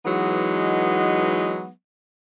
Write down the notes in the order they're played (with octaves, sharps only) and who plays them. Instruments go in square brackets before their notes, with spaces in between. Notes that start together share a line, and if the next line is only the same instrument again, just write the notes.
[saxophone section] E3 F#3 G#3 B3 D#4